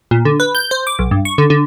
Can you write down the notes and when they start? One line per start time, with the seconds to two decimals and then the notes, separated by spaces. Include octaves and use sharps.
0.11 A#2
0.25 D3
0.40 B4
0.55 G6
0.71 C5
0.87 D6
0.99 B1
1.11 G2
1.25 C#6
1.38 D3
1.50 D3